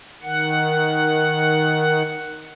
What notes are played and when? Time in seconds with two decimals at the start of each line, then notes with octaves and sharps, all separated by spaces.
0.23 D#3 F#5